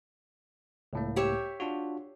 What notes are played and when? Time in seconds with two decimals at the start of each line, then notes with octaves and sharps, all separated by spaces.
0.93 C#2 A2 A#3
1.16 G4 C#5 E5
1.60 D4 F4 F#4